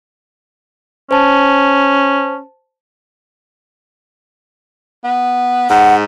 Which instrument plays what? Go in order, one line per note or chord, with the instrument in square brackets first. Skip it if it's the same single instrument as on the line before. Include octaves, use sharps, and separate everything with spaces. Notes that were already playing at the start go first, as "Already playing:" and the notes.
[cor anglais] C#4 [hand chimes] C5 A5
[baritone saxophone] B3
[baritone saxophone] G#2 [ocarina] F#5